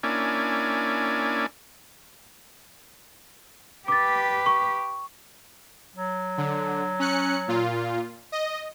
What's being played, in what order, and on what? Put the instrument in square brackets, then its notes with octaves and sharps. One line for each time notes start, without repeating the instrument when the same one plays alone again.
[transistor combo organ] A#3 C#4 D4 E4 D5 G#5
[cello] G4 B4 [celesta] D6 A6
[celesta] C#6
[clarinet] F#3
[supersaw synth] D3
C#4 F#6 C#7
A#2 F4
D#5